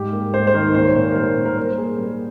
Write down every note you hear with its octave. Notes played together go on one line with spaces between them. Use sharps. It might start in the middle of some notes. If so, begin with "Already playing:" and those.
Already playing: G#2 G3 G4
A#3
G#2 C5
C5
D#3 A#4
A#2 C5
C#5
A#2 C5
A#4
G3 C5
A#2
A#4
A#2 C5
A#4
A#3 G#4
G3 A#4